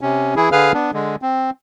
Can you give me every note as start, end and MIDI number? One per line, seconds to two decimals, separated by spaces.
0.01 0.34 48
0.01 0.34 61
0.36 0.49 52
0.36 0.49 64
0.36 0.49 68
0.52 0.72 50
0.52 0.72 68
0.52 0.72 71
0.52 0.72 77
0.52 0.72 89
0.74 0.91 59
0.74 0.91 62
0.94 1.16 50
0.94 1.16 56
1.22 1.50 60